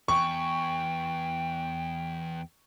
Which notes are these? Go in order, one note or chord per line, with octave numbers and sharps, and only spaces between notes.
E2 G5 C#6